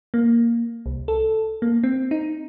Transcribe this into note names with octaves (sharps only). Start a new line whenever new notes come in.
A#3
C2
A4
A#3
C4
D#4